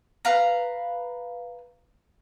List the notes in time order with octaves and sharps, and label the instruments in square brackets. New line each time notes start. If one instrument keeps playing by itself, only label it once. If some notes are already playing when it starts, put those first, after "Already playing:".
[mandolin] B4 F5 A#5